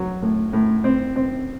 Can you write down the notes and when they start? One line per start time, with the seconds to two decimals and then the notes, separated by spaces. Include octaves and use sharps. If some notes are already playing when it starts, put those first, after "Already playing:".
Already playing: F#3
0.22 A2
0.53 A2
0.84 C4
1.16 C4